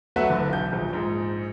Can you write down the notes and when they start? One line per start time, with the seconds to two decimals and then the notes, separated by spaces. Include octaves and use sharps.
0.16 F#3 A3 B3 F#4 B4 E5
0.29 F#1 D3 B4
0.49 B1 G6
0.72 D#1 A#1
0.93 A#1 G#2